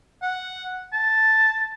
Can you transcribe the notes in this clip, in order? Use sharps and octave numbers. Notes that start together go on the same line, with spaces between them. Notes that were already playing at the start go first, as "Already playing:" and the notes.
F#5
A5